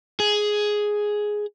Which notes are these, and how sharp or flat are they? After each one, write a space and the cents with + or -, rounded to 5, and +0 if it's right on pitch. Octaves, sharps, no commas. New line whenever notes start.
G#4 +5